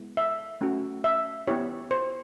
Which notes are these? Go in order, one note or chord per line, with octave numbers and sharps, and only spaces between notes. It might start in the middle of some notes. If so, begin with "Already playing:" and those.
Already playing: G#3 B3 E4
E5
A3 C#4 F#4
E5
B3 E4 G4 C#5
C5